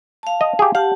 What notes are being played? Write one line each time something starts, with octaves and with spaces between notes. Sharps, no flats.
F5 A5
D#5
G4 G#4
G4 F5 F#5 A5